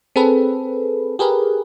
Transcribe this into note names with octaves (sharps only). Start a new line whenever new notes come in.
C4 G#4 A4 B4
G4 G#4 A#4 B4